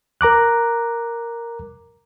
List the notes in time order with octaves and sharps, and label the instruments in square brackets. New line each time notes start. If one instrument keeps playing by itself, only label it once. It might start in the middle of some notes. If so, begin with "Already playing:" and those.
[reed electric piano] A#4 A#5 D6 F#6